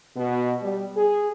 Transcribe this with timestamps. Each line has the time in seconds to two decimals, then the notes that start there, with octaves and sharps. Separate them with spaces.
0.16 B2
0.62 G3
0.96 G#4